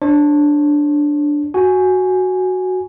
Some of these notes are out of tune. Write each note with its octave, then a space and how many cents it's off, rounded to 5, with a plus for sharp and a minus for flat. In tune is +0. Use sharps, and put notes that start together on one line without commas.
D4 +0 C#5 -40
F#4 +0 G#5 +0